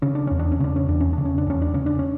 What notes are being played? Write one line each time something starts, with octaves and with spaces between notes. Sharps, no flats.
C#3 C#4
D4
E2 C#4
D4
C#4
C#3 D4
C#4
E2 D4
C#4
C#3 D4
C#4
D4
E2 C#4
D4
C#3 C#4
D4
C#4